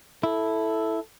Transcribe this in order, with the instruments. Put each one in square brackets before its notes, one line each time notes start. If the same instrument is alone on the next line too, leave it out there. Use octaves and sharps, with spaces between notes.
[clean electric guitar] E4 [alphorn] A4